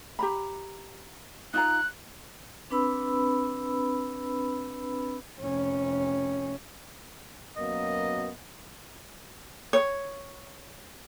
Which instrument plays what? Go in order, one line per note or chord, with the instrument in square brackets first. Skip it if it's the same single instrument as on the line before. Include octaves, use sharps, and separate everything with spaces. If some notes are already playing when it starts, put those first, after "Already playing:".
[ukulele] G4 A#5 B5
[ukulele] D#4 F4 A#5 [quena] F#6
[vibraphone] C4 D4 B4 B5 E6
[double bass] F1 C#4
[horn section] F#2 B2 A#3 B3 D#5
[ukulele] C#5